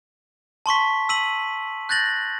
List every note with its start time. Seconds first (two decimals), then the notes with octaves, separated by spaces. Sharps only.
0.66 A5 C6 C#6 B6
1.09 E6 B6 D#7 F#7
1.89 F#6 G6 A6 A#6 F#7